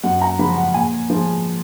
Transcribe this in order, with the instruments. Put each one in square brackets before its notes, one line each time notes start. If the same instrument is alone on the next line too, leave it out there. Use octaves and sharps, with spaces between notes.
[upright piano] F#2 F#5
A#5
C#3 F3 G#3 B5
F#5
A#2 G#5
F3 G#3